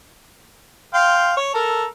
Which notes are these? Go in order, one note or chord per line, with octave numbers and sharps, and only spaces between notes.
F5 G5 C6
C#5
A4 A#4